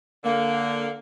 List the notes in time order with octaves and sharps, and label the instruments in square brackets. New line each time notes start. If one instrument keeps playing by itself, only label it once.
[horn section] D3 A#3